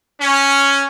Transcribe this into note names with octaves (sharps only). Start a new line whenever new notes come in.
C#4